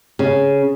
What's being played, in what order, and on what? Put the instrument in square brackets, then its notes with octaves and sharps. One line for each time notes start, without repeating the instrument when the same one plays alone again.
[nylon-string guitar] C#3